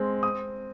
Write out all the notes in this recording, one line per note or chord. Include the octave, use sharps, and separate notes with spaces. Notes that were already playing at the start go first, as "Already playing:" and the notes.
Already playing: G#3 C4
D#6